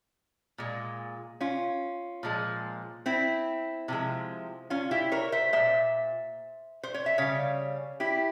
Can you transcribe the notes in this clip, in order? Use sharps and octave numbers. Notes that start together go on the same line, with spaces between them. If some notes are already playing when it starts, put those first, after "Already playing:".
A#2 G#3
C#4 F4
A#2 F3 G#3
C4 E4
C3 F3 G#3
C#4 F4
E4 G4
A#4 C#5
C5 E5
A#2 G#3 C5 E5
C5
C#5
E5
C#3 G3 C#5 F5
E4 G4